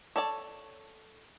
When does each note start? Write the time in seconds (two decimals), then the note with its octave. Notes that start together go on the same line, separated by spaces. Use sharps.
0.16 A4 C#5 D5 A5